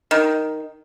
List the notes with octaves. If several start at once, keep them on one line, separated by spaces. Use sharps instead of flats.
D#3